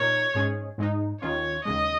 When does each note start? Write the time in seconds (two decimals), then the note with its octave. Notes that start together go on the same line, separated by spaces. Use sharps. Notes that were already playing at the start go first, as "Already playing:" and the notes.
Already playing: A#2 D#4 A#4 C#5
0.35 G#2 G#3 C#4 G#4
0.78 G#2 G#3 D#4
1.22 D#2 D#3 C#4 F4 C#5
1.65 D#2 C#3 G#3 D#5